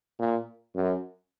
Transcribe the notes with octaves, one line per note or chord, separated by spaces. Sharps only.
A#2
F#2